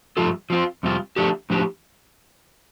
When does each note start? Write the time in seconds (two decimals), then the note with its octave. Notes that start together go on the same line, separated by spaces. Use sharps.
0.17 G2 F3 A3 F4 A4
0.50 F3 C4 F4
0.83 F2 C3 G3 F4
1.16 D3 F3 A3 D4 G4
1.50 A2 F3 D4 G4